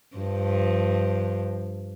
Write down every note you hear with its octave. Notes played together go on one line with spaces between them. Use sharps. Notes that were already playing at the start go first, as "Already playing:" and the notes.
G2 F3